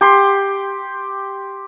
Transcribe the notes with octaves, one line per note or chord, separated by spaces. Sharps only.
G4 C6